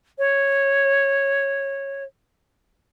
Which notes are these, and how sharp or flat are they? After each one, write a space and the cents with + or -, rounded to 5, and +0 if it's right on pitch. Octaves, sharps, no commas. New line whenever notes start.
C#5 -10